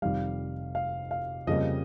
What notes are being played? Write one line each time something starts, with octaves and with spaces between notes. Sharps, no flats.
F1 F2 D#3 G3 F5
F5
F5
F2 C#3 G3 A#3 D#5